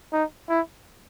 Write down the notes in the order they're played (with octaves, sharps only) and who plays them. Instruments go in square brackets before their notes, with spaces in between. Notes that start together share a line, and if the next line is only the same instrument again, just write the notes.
[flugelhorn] D#4
E4